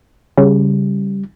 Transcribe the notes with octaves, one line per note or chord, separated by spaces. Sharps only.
C#3 G3